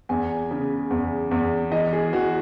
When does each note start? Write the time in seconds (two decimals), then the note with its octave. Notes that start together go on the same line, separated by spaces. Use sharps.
0.09 E2 G#5
0.51 C#3
0.90 E2
1.31 E2
1.72 E3 D#5
1.93 G#4
2.13 E3 F#4